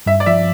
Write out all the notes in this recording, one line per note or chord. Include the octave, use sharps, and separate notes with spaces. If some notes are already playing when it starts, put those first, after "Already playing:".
G2 E5
D5
F3 E5